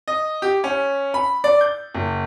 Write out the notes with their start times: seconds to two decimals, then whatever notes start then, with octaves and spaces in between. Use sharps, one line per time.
0.08 D#5
0.42 G4
0.64 C#4
1.14 B5
1.44 D5
1.61 G6
1.95 F#1